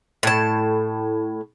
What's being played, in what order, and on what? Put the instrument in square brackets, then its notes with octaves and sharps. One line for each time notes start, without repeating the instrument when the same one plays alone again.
[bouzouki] A2 A5